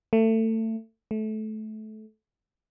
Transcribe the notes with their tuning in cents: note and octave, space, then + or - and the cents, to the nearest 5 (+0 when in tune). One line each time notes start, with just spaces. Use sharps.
A3 +25
A3 -20